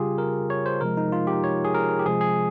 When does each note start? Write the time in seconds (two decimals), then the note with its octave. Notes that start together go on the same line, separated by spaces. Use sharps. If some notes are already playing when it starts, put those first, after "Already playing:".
Already playing: C#3 G3 F4 G4 G#4
0.18 A#4
0.50 C#5
0.66 C5
0.81 C3 F3 G#3 A#4
0.97 D#4
1.12 F4
1.27 G4
1.44 C#5
1.64 G#4
1.74 A#4
1.99 G4
2.06 C3 F3 G#3 G#4
2.21 G#4